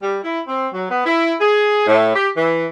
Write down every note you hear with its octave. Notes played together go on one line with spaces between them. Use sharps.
G3
E4
C4
F#3
B3
E4
G#4
A2
G4
E3